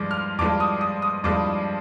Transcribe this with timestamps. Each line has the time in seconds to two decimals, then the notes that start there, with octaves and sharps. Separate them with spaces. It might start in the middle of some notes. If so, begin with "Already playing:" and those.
Already playing: G2 F3 G#3 D6
0.11 F6
0.39 G2 F3 G#3 D6
0.60 D#6
0.81 D#6
1.02 D#6
1.24 G2 F3 G#3 D6